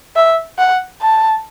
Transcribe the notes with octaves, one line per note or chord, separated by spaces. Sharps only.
E5
F#5
A5